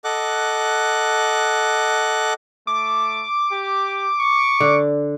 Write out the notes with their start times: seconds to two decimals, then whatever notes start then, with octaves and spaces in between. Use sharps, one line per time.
0.04 A4 D#5 F#5 D6 F#6
2.67 A3 D6
3.52 G4
4.19 C#6
4.60 D3